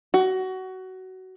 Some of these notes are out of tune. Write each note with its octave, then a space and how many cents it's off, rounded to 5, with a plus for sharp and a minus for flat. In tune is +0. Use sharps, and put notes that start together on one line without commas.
F#4 +20